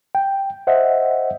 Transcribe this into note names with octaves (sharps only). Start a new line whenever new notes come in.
G5
C5 D#5 E5 F#5